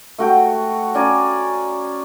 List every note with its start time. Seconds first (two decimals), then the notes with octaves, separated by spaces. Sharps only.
0.18 A3 F#4 G5
0.94 C#4 D5 G#5 A#5